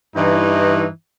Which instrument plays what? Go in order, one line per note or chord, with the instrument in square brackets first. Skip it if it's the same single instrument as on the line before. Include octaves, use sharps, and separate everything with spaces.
[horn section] G2 E3 D#4